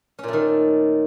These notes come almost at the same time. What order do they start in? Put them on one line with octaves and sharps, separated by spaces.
C#4 A#2 A3 D#3